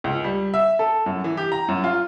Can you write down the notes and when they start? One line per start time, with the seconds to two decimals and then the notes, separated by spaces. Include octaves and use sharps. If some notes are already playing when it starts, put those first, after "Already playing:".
0.04 C#2
0.24 G3
0.54 E5
0.79 A4
1.06 F#2
1.24 E3
1.37 G4
1.52 A#5
1.68 F#2
1.84 F4